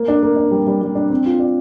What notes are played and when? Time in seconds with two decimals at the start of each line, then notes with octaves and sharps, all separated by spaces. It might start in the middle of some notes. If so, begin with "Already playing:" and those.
Already playing: A#3
0.08 D4
0.23 A#3
0.36 D4
0.51 G3
0.67 G3
0.81 G3
0.95 D4
1.10 C4
1.26 F4
1.39 D5